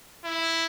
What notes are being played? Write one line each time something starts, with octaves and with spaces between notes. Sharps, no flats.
E4